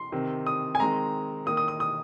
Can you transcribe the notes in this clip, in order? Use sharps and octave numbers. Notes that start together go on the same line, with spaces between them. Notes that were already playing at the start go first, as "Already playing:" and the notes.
Already playing: C6
C3 D#3 C4
D#6
G#5
D#3 G#3 C4 A#5
D#3 A#3 D#6
D#6
D#6
D#6